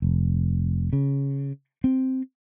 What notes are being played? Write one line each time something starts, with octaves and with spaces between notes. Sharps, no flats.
F1
C#3
C4